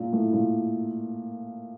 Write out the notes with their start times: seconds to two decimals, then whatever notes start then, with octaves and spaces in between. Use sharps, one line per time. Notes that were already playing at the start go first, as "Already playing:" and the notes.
Already playing: A#2
0.13 A2
0.33 A#2